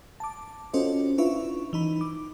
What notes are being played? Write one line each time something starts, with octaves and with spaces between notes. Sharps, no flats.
A5 D6
C#4 F4 F#4 A4 C5 D#5
D4 E4 F4 B4 E5 C#6
E3 D#4 B5
D6